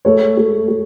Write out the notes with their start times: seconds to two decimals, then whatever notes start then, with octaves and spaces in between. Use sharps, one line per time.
0.05 A3 C#5
0.37 A3
0.69 A3